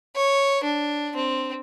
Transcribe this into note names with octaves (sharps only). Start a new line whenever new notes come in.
C#5
D4
C4